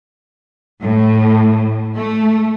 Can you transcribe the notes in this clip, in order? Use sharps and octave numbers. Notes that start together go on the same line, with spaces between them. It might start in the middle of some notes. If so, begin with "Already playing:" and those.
A2
A3